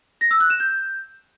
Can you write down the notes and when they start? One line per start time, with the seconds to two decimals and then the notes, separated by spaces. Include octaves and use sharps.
0.21 A#6
0.31 E6
0.40 F#6
0.50 E7
0.60 G6